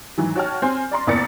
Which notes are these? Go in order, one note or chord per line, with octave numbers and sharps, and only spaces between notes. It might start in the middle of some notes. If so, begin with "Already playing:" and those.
G#2 D#3 E3 F#3
F#4 C#5 G5 A5 F6
C4 G#5 C6
D5 A#5 C6
F1 E2 A#3 D5 A6 C#7